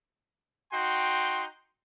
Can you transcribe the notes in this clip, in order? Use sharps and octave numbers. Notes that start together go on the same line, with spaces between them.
D#4 F#4 G5 C6